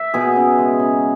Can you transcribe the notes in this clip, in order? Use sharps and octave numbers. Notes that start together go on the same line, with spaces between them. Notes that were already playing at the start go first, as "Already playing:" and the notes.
Already playing: E5
B2 G#4
C#3
G#3
C#3